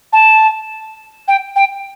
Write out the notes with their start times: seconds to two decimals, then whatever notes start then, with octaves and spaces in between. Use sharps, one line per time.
0.12 A5
1.28 G5
1.55 G5